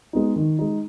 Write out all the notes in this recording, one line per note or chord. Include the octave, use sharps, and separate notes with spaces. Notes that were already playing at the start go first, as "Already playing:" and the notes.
G#3 B3 D#4
D#3
G#3 D#4